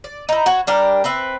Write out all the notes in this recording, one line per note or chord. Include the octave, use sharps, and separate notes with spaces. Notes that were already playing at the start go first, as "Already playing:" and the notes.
D5
D#4 E4
F#4 C#5
G3 D4 G4 A#4
C4 B4 E5